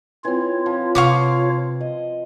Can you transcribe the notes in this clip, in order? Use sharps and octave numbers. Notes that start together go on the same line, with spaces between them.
E3 C4 F4 C#5
F3
C3 F5 C#6 D6
D#5